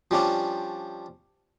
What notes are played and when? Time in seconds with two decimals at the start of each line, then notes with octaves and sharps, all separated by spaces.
0.11 F3 G3 C#4 D4